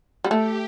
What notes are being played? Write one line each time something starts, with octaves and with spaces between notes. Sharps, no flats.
G3
A3 G4